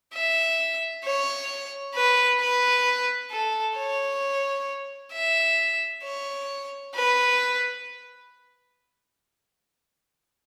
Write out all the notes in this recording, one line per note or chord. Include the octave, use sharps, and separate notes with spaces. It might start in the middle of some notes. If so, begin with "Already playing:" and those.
E5
C#5
B4
B4
A4
C#5
E5
C#5
B4